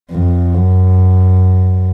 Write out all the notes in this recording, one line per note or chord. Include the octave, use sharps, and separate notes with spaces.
F2
F#2